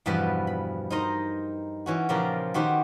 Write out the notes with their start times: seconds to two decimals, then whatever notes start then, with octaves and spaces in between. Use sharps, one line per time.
0.06 E2 G2 B2 F3 G3 B4
0.47 B5
0.90 D#4 A#4 C5 D#5 A#5
1.86 E3 C#4 F#4
2.09 A#2 C#3 F3 G4 A#4 A#5
2.54 D#3 F#4 G4 B4 C5